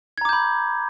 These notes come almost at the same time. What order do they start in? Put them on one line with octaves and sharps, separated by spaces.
G#6 A#5 D6 G6 B5